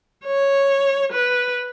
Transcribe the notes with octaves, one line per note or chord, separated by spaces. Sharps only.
C#5
B4